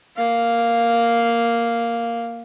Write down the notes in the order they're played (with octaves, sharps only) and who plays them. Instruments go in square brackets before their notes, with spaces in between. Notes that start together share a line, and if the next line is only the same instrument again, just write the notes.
[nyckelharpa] A#3 F5